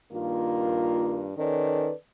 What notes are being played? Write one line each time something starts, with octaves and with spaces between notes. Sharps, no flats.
G2 D#3 A#3 F4
D#3 C#4 A4 B4 D5